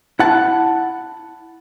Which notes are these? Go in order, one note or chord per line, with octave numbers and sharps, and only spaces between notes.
E4 F#5 A5